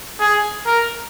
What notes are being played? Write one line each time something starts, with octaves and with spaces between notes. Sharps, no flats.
G#4
A#4